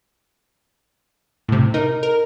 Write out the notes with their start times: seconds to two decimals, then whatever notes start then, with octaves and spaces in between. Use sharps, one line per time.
1.48 A2 C3
1.74 D#4 A#4
2.03 A#4